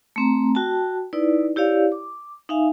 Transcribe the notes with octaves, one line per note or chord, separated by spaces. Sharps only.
A3 C4 A#5
F#4 G5 A5
D#4 E4 B4 D5
E4 G4 C#5 D5 F5
D6
D#4 E5 F5 G#5